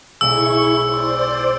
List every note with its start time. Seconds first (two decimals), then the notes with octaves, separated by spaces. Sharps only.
0.21 B1 G#3 E4 C#6 E6
0.85 C5 D5